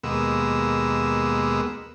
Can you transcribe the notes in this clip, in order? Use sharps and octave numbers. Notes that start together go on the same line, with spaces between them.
D#2 B2 G#3 A#3 B3 E6